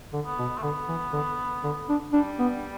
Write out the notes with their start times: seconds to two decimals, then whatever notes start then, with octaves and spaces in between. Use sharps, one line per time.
0.13 D3
0.25 B3
0.38 B2
0.58 A3
0.63 D3 B3
0.88 E3
1.13 D3
1.64 D3
1.89 D4
2.13 G3 D4
2.39 B3